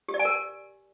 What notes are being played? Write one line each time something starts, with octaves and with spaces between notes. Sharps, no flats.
G4
D5
G#5
A#4